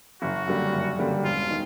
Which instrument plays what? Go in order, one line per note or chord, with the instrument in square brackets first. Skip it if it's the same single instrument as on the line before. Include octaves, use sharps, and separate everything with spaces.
[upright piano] F#1 [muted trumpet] F#4
[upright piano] F#2 D3 G3 A#3
F#1
F#2 D3 G3 A#3
[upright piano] E1 [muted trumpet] F4
[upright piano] D#3